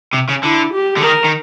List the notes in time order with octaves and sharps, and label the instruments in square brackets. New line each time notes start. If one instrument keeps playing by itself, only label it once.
[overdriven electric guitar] C3
C#3
[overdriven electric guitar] D3 [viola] E4
[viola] G4
[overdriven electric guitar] D3
[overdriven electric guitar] D#3 [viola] A#4
[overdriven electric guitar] D#3